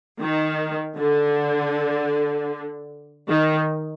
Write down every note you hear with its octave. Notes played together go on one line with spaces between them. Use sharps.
D#3
D3
D#3